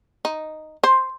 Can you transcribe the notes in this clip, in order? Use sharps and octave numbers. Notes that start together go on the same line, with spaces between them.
D#4
C5